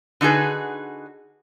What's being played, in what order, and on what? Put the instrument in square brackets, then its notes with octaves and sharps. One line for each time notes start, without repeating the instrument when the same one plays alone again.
[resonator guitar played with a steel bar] D3 D#4 F#4 G#4 B4